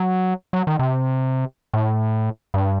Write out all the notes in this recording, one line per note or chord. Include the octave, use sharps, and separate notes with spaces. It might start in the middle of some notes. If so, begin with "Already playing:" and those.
Already playing: F#3
F#3
D#3
C3
A2
G2